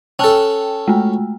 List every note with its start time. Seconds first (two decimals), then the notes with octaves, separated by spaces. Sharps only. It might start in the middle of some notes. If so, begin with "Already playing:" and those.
0.19 C#4 A4 G5 A5
0.88 G#3 A3